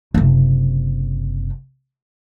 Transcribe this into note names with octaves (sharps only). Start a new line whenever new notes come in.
F#1 C3